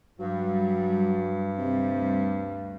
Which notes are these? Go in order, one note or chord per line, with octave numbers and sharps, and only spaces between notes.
G2 F#3 G3
D2 C3 G3